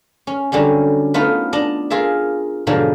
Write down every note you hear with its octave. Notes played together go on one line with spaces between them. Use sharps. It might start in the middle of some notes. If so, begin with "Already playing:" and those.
C#4
D3 F#3 G3 C#4
A3 B3 D#4 F4 B4
D4 D#5
F4 G#4 A#4 E5
G#2 B2 D3 F3 F#3